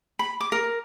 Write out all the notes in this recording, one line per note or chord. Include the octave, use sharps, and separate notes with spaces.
B5
D6
A#4